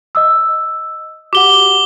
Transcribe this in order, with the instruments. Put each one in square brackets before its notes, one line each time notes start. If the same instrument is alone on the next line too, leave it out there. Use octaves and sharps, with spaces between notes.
[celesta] D#5 D#6 E6
[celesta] F#4 G4 F#5 [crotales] D6 G7